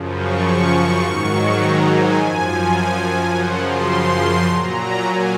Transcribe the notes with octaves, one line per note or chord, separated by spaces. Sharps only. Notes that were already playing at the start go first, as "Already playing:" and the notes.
Already playing: F#2 C#3 F3
C#6
G#2 D#3 F#3
A#5
G#5
F#2 F3
F#2 C#3 F3 F#5
C6
A#2 F#3 A#5
G#5